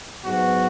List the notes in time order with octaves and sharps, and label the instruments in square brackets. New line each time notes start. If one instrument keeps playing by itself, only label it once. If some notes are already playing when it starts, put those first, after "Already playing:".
[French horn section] G#2 F#3 B3 [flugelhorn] F#4